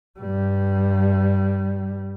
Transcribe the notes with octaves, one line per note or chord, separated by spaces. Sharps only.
G2 G3